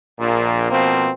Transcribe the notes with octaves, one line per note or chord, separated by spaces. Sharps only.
A#1 A#2
B2 F3 A#3 C4